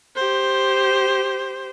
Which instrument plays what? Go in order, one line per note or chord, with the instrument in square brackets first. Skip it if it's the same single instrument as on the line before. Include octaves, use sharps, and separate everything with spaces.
[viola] G4 C5